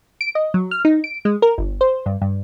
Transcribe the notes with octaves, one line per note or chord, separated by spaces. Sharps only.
D7
D#5
F#3
F6
D#4
D7
G#3
A#4
G1
C5
G2
G2